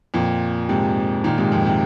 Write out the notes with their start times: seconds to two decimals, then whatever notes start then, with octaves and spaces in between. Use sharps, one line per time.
0.14 F2 A#2
0.69 G#2 C3
1.24 A#2 D#3
1.38 G#2 C3
1.52 F2 A#2
1.66 C3